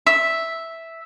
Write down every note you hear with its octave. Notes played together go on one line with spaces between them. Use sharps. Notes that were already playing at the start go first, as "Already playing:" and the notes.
E5